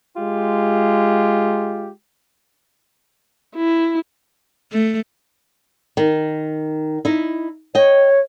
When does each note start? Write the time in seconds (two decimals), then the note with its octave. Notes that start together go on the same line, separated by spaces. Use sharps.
0.17 G#3 F4 G4
3.55 E4
4.72 A3
5.97 D#3
7.05 D#4 E4
7.75 C#5 D#5 G5